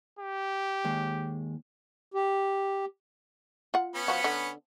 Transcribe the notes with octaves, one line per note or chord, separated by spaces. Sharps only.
G4
D#2 G#3
G4
F4 F#5
B3 C#4 B4
F3 F#4
D3